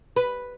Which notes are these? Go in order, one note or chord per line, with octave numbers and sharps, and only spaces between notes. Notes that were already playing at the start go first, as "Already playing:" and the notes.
B4